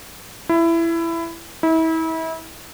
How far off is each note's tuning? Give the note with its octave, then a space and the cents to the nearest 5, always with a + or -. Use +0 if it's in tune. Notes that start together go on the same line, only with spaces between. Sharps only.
E4 +15
E4 -35